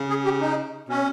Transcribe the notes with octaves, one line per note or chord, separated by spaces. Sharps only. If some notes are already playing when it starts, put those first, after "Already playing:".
Already playing: C#3
G#4
G4
D#4
B2 C#4